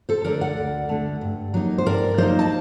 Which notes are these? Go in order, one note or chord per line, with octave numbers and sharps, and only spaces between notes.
A4 C5
D3 A3 A#4 D5
D5 F#5
D2
D3 A3
G2
F#3 A#3 D#4
C5
G2 A#4 D5
F#3 A#3 D#4 C5 D#5
A5